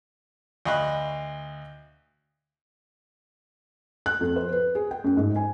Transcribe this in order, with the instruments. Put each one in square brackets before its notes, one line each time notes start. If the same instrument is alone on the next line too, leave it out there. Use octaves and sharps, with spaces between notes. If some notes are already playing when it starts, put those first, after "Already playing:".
[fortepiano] D2 D#5 F5 B5 C#6 F#6
[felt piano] F#6
F2
C5
B4
G#4
G5
F#2
G#2
G#5